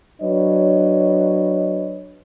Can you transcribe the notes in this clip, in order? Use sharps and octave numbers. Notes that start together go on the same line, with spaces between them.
F#3 D4 B4 C#5 D#5